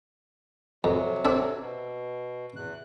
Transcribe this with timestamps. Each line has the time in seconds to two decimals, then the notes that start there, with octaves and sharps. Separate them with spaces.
0.84 F2 C3 F#3
1.25 C4 D4 A4
1.61 B2
2.56 E2 F#6